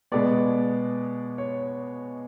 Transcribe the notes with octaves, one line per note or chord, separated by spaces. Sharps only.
B2 G#3 B3 D5
C#5